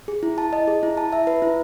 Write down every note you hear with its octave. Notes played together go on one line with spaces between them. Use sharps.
G#4
E4
A5
D#5
G#4
E4
A5
E5
B4
E4